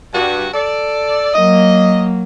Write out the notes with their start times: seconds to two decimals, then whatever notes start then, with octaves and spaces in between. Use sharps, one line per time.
0.14 G2 F#4
0.54 A4 D5
1.34 F#3 A#3 D#5